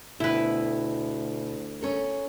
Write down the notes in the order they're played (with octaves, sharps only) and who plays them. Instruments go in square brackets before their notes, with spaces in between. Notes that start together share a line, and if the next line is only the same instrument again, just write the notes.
[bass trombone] D2 [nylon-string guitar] B2 G5 [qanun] E4 B4
[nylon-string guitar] C#4 A4 A#4